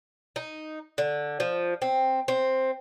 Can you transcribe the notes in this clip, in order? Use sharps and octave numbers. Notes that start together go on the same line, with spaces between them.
D#4
D3
F3
C4
C4